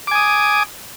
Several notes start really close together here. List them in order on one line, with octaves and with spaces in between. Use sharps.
D6 G#5 D#6